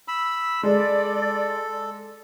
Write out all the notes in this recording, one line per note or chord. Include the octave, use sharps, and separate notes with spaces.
B5 E6
G#3 A4 D5